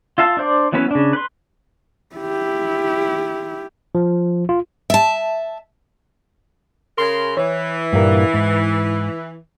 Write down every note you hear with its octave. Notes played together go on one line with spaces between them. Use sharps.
F4 E5 F5 A5
D4 C5 D5
E3 F#3 B3 C#4 B4
C#3 D4
B4 C6
E4 G4
F3
F4
E5 A5
C#3 A#4 C6
E3 C#5
G2 A#2 A#3
G#2